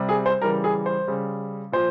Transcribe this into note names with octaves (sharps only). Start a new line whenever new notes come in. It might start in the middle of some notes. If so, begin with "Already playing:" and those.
Already playing: C3 G3
G#4
C5
C#3 E3 G3 A#4
G#4
C5
C#3 G3
A#2 F3 C5